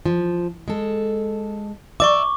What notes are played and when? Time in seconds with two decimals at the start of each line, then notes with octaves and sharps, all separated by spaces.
0.06 F3
0.68 G#3 A4
2.00 D5 E5 C#6 D6